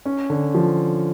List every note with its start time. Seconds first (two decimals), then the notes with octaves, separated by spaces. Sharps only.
0.06 C#4
0.30 D3
0.55 F3